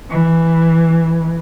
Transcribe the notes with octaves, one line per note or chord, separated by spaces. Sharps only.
E3